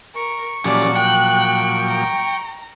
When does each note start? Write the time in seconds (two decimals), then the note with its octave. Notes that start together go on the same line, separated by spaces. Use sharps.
0.16 A#4 C#6
0.65 A#2 F3 F#3 C#4 G4 D5
0.96 G5 F#6
1.87 A#5